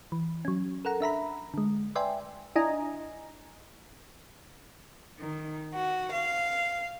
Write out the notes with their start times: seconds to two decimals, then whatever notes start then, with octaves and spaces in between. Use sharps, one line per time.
0.12 E3
0.45 F#3 C#4
0.85 A4 A#4 F#5 A#5
1.00 D4 E5 A#5 B5
1.54 D3 G#3
1.95 B4 D5 E5 G5 G#5 C6
2.56 D4 E4 D#5 G#5 A#5
5.20 D#3
5.74 F#4
6.12 F5